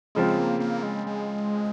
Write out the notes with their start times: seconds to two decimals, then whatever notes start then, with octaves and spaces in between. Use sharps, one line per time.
0.15 C#3 F3 G#3 C4 F4
0.38 A#3
0.60 A#3
0.83 G#3
1.07 G#3